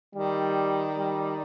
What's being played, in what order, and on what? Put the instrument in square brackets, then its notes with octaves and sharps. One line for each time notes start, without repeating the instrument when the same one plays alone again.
[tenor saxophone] D#3 [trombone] G3
[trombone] G3